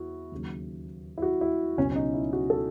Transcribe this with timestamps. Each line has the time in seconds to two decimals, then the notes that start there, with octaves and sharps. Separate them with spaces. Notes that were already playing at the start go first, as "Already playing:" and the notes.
Already playing: E2 E4 F#4
0.32 D#2 C#3 F#3
1.18 E4
1.22 F#4
1.41 E4
1.77 C#2 B2 F#3 C#4
1.92 C#4
1.96 D#4
2.14 E4
2.33 F#4
2.50 A4